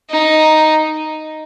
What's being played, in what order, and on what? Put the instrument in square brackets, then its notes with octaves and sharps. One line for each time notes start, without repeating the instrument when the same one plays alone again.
[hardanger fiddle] D#4